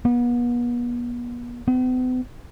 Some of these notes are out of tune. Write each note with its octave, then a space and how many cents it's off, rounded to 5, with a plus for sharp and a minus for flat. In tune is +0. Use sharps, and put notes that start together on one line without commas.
B3 -40
B3 +45